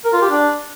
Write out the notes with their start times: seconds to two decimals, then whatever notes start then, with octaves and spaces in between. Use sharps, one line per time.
0.05 A#4
0.13 F4
0.22 G4
0.30 D4